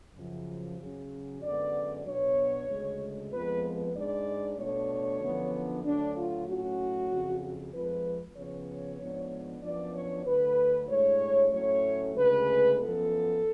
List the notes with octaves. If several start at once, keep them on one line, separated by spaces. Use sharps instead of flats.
F#2 C#3 F3
C#3 F#3 C#4
F#2 D3 G#3 B3 D5
B2 F#3 B3 D4 C#5
D2 C#3 G#3
F2 F3 G#3 B3 B4
B4
G#2 G#3 D4 D5
B2 A3 D4 C#5
F#2 D3 F3 B3 D4
D2 D3 F#3 D4
F4
A2 F#3 C#4 F#4
F2 C#3 F#3
F2 F3 G#3 B4
C#3 F3 B3 C#5
G#2 F3 B3 D4
F#2 F3 B3 D4 D5
C#5
D2 D3 F#3 B4
A2 G#3 D4 C#5
A2 F#3 A3 C#4 C#5
D2 C#3 G#3 B4
F#2 F3 B3 A4